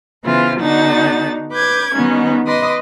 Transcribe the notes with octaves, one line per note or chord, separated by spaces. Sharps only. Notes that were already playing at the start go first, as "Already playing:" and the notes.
C#3 E3 B3 F4 C5
D3 B3 D4 D#4 F#4 A6
B4 D6 G6 G#6
D#3 G3 B3 C#4 D#4
B4 D#5 C6 D6 D#6